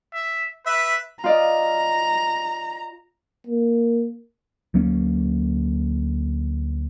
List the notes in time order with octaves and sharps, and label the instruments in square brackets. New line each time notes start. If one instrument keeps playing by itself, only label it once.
[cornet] E5
[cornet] B4 [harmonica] E5
[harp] F4 D5 D#5 [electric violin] A#5
[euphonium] A#3
[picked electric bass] D2 F#3 A#3 C#4